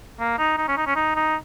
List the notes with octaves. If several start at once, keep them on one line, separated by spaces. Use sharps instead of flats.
A#3
D#4
D#4
C#4
D#4
C#4
D#4
D#4